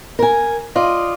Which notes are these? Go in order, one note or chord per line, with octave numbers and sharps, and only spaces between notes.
A#4 G#5
F4 D5 D#5